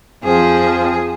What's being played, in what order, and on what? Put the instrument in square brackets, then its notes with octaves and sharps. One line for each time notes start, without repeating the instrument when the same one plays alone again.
[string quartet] F2 F3 C4 G#4